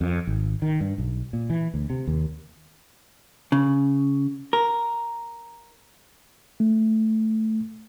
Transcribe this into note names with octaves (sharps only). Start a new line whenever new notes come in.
F2
G#1
D#3
G2
B1
A#2
E3
D2
C3
D#2
C#3
A#4
A3